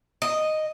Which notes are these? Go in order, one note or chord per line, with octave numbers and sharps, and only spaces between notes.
D#5